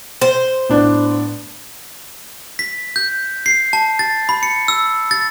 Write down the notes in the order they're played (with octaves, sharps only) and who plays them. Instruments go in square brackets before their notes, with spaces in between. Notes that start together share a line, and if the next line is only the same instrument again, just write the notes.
[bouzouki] C5
[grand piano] A2 B3 D4
[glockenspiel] B6
G6
C7
A5
A6
B5
C#7
E6
A6